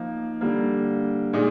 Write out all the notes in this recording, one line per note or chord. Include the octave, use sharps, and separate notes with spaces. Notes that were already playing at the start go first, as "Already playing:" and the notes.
Already playing: F3 A#3 D#4
D3 G3 A#3
A#2 G#3 D#4